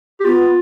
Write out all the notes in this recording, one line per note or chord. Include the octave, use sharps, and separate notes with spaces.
G4
B3 F4